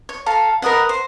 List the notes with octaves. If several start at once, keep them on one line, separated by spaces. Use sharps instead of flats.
C#5
A4 F5 A#5
A#4 B4 D#5 F#5
C5